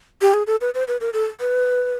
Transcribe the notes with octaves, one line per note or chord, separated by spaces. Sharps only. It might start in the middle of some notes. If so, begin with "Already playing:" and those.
G4
G#4
A4
B4
C5
B4
A#4
A4
B4